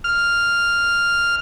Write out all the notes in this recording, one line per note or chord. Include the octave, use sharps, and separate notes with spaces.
F6